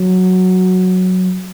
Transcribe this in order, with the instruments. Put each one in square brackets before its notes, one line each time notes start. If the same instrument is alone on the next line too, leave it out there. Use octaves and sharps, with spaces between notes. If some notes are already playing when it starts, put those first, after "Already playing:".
Already playing: [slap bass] F#3